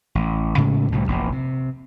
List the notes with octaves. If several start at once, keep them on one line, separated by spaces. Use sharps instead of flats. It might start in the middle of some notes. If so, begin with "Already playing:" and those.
A1
A2 C#3 G#3 A3
C2 A2 D3 G3
F1 A#1 E2
C3